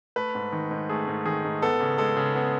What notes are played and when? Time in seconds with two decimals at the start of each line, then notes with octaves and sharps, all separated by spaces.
0.16 A3 B4
0.35 G#2
0.52 D#3
0.71 G#2
0.89 A3 G#4
1.08 G#2
1.25 D#3 G#4
1.44 G#2
1.62 B3 A4
1.81 C#3
1.98 G#3 A4
2.17 C#3
2.35 B3